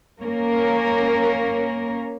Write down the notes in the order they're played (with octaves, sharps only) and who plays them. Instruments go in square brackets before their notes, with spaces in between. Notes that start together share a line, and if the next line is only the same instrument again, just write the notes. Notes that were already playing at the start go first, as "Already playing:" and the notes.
[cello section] A#3 C#4 A#4